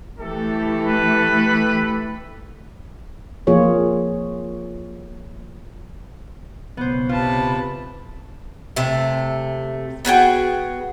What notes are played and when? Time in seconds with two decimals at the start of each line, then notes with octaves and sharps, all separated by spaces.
0.20 E3 A3 G4 A4
0.87 B4
3.47 F3 A#3 F4 G#4 C#5
6.77 B1 C#3 B3 C5
7.09 C3 F4 B4 A5
8.76 C3 A3
10.05 B3 F#4 G#4 G5